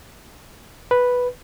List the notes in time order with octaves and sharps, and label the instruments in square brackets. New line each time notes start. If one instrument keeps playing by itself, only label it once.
[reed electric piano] B4